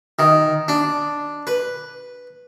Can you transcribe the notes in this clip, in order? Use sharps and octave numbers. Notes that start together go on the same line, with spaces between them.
D#3
D4
B4